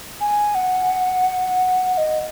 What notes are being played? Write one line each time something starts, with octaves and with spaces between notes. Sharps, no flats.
G#5
F#5
F#5
D#5